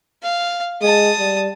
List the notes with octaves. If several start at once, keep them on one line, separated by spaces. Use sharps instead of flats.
F5
G#3 A5 D#6
G3